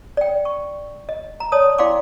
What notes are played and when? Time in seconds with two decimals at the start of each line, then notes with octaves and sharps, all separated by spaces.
0.17 D5 G5
0.45 C#6
1.09 D#5
1.40 A#5
1.52 C#5 D5 A5 D#6
1.78 E4 D5 F5 G5 C6 D6